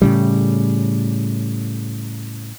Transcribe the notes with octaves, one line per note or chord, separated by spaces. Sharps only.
A2 C#3 G3